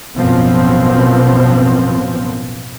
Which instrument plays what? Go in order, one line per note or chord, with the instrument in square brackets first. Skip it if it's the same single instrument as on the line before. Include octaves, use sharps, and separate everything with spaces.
[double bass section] A1 F#2 B2 F3 B3 C4